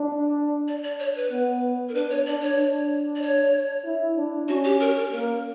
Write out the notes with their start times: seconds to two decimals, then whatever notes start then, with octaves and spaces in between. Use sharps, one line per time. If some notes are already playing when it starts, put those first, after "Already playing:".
Already playing: D4
0.68 D5
0.84 D5
1.00 C#5
1.16 B4
1.31 B3
1.89 A#4
1.95 D4 B4
2.11 C#5
2.27 D4 D5
2.42 C#5
2.58 D4
3.16 D5
3.22 C#5
3.85 E4
4.17 D4
4.48 C#4 F#4
4.64 G4
4.80 A#4
4.96 A#4
5.12 A#3 A#4